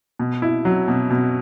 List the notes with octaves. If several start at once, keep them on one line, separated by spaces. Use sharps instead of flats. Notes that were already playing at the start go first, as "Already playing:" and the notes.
B2
E4
F#3
B2
B2